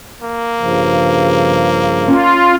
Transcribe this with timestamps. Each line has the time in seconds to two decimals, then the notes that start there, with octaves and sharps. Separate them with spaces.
0.22 A#3
0.60 G2 C#3 F3
2.08 C#4 F4